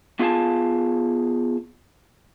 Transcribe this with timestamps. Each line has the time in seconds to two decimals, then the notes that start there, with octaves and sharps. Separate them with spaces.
0.19 B3 F4 G#4 F5 G#5 A5